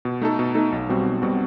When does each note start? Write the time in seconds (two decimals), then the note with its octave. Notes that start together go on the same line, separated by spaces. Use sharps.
0.05 B2
0.21 A3 D#4 A4
0.39 B2
0.55 A3 D#4 A4
0.72 B1
0.89 B2 G3 C4 F#4
1.06 B1
1.22 B2 G3 C4 F#4